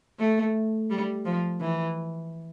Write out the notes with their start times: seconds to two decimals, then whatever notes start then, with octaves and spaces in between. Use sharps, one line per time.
0.20 A3
0.90 G3
1.25 F3
1.61 E3